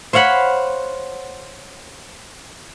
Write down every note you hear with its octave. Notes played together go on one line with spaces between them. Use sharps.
C5 C#5 F5 F#5 B5